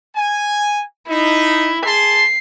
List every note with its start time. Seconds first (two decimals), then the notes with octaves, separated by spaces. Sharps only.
0.15 G#5
1.09 D#4 E4
1.86 G#4 A5 C6 C7